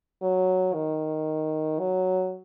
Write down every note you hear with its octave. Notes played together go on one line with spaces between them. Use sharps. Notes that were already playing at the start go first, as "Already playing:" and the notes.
F#3
D#3
F#3